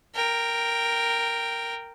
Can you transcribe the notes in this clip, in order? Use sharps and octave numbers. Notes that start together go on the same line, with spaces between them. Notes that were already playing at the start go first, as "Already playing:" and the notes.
A#4 G5